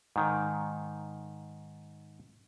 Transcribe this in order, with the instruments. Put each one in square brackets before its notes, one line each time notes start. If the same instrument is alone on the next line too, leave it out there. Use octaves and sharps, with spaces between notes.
[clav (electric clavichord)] G#2 D#3